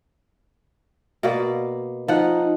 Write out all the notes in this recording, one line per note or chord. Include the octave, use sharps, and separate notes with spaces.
B2 A#3 D5
F3 D#4 F#5